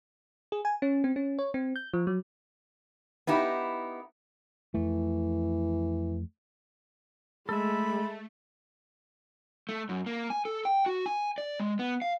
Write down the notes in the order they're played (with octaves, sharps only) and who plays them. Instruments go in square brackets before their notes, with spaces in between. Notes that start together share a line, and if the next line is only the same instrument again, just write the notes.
[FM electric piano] G#4
G#5
C#4
C4
C#4
C#5
C4
G6
F3
F#3
[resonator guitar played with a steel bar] B3 D#4 E4 G4
[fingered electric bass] F2 A3 [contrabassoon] E3
[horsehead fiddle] G#3 [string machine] A3 [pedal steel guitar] A4 E5 [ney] B5
[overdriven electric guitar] A3
F#2
A#3
G#5
A4
G5
F#4
G#5
D5
G#3
B3
F5